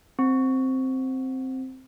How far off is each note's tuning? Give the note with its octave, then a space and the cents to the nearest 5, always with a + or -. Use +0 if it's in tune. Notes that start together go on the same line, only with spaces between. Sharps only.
C4 +0